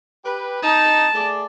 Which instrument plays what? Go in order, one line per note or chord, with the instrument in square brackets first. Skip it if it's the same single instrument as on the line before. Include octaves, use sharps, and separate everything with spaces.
[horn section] G4 B4
[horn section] D#4 [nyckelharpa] A5
[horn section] A3 G#4 D5